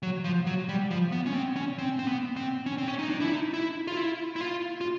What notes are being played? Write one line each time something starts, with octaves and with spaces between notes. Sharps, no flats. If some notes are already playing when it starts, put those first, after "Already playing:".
F#3
F3
F#3
G3
F3
B3
C#4
C4
C#4
C4
C4
B3
C4
C#4
C4
C#4
D#4
D4
E4
D#4
E4
F4
E4
E4
F4
F4